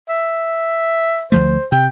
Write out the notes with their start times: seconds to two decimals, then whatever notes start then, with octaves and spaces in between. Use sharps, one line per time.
0.09 E5
1.32 D2 F3 A3 C5
1.72 C3 G5